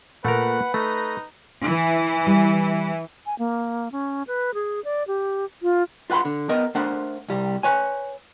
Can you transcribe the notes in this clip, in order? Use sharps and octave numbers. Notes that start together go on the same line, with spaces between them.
A#2 A3 A#4 B4 F#5
A3 D#4 A#6
E3
G3
G#5
A#3
C#4
B4
G#4
D5
G4
F4
F4 B4 F#5 B5 C6
D3
B3 A#4 D#5
A3 D4 A#4 C5 F#5
C2 G3
B4 C#5 G#5